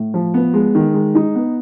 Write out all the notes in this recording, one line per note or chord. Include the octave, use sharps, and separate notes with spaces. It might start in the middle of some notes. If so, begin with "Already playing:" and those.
Already playing: A2
F3
B3
G#3
D#3
G#3
D#4
B3